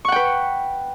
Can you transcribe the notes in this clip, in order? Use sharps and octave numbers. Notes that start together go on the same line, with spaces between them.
B4 F#5 G5 C#6